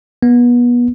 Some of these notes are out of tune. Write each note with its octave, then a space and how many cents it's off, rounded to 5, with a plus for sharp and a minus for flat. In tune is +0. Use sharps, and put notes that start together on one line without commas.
B3 -30